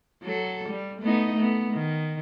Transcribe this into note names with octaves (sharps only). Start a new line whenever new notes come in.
F#3 A4
G3
A3 B3 D#4
A3 B3
D#3